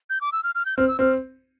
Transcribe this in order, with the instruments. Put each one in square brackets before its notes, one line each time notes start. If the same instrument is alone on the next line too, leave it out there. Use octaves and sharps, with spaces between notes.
[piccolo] G6
D6
E6
F6
F6
G6
[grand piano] C4 [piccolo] F6
[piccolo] E6
[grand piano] C4 [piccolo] F6